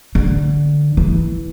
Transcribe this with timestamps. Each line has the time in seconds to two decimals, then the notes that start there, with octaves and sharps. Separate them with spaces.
0.15 D3
0.97 E3